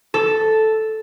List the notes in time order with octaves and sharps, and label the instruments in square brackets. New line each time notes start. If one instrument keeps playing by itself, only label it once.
[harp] A4